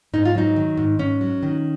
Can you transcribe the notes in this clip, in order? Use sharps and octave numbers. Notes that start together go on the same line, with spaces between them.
G#2 D#4
F4
F#3 D#4
D#3
G#2
G#2 C#4
F#3
D#3